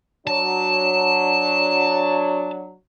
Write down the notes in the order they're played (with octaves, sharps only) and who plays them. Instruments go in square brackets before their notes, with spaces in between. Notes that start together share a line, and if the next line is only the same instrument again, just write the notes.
[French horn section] F#3 D4 C#5 [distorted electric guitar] A5